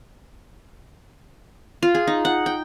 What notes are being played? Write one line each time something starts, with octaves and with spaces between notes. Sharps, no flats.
F4
G#4
D#4
F#5
G5